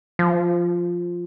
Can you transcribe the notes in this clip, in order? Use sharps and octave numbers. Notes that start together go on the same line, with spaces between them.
F3